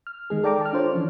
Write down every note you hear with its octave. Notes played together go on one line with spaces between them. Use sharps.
F6
D#3 G#3 G#4
A4 D5 G5 A#5 D6
A5 F6
D4 F4 C5 C#5
E3 F3 C#4